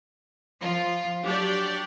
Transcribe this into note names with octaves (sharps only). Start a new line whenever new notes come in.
F3 F4
F#3 D4 G4 C#5 D5